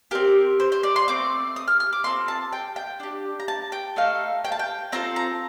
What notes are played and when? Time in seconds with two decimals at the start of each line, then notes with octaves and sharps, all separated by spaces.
0.11 C4 G4 A#4
0.60 C5
0.72 C5
0.83 D5
0.96 C6
1.08 A3 C4 D6
1.56 D#6
1.68 F6
1.80 F6
1.93 D6
2.04 C4 F4 A4 C6
2.28 A5
2.52 G5
2.76 G5
3.00 D4 G4
3.40 A#5
3.48 A5
3.72 G5
3.96 A3 D#4 A4 F5
4.44 G5
4.52 A5
4.59 G5
4.92 C4 F4 A4 A#5
5.16 A#5